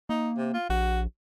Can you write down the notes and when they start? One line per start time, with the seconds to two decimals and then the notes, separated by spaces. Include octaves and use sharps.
0.09 A#3 D#4
0.37 C3
0.54 F4
0.70 A#1 F#4